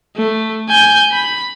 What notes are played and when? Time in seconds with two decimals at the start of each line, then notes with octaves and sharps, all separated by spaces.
0.16 A3
0.69 G#5 G6
1.12 B5